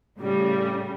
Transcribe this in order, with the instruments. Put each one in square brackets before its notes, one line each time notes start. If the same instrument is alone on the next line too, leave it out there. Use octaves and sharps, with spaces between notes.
[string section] A2 C#3 G3